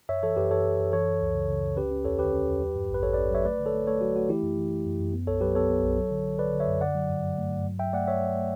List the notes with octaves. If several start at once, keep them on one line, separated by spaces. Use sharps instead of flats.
F#2 C#5 E5
E3 A4 C#5
F#2 G4 B4
F#2 A4 C#5
F#2
F#2
E3 A4 C#5
E3
C#2
C#3
C#3
C#2
C#4 G4 B4
C#4
E2 A4 C#5
D3 G4 B4
C#4
E2
F#3
G2
A1
B4
A1 A4 C#5
C#4 B4 D5
F#3 C#5 E5
A3 B4 D5
D3
A4 C#5
A3
A3 A4 C#5
F#3 F#4
A3 F#4
E3 E4 G4
F#2
E3
E3
F#2
F#2
B3
B1 A4 C#5
F#3 G4 B4
B3 A4 C#5
B3
B1
F#3
D3
D3
D3 B4 D5
D3
C#5 E5
F#2
D3 D5 F#5
F#3
G2
F#3
A3
G2
F#3
F#3 E5 G5
A3 D5 F#5
A3 C#5 E5
F#3
A3